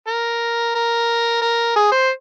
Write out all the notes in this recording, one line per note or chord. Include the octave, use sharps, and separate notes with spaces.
A#4
A#4
A#4
G#4
C5